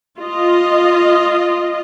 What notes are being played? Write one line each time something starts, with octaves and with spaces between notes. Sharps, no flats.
F4 D#5